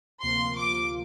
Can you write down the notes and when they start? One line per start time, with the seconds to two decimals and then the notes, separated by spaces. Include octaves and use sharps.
0.22 D2 C3 F3 A#3 F4 C6
0.56 D6